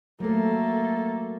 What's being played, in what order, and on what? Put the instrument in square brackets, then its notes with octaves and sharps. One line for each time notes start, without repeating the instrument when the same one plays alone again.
[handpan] F#3 A3 [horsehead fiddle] A#3 A4